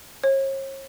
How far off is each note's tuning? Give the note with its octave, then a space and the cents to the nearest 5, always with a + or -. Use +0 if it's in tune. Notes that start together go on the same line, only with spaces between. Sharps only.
C#5 -40